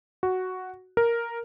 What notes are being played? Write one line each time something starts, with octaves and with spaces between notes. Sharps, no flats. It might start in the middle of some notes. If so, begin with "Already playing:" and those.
F#4
A#4